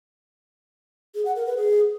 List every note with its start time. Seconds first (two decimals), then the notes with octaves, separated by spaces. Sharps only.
1.15 G#4
1.25 F#5
1.36 A#4
1.46 B4
1.57 G#4